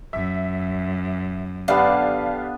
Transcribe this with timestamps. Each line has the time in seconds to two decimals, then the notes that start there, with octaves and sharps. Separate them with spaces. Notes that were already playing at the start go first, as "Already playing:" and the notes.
0.13 F#2 E5
1.68 D3 B3 D4 G4 D5 F5